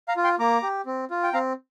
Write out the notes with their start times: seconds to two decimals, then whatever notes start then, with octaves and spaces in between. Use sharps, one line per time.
0.08 F5 A#5
0.17 F4
0.24 G5 C6
0.39 A#3 A#5 D6
0.63 G4
0.86 C4
1.11 F4
1.23 G5
1.34 C4 F5 A#5